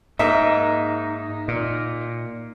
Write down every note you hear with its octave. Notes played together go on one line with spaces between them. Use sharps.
G#2 A#3 D#4 D#5 E5
A#2